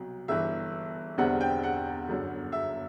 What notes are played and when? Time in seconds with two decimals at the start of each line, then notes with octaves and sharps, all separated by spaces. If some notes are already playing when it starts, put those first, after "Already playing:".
Already playing: C2 B2 F#3
0.28 G1 G2 E3 E5
1.18 E1 E2 D3 G3 C4 F#5
1.41 G5
1.63 F#5
2.08 G1 F#2 D3
2.52 E5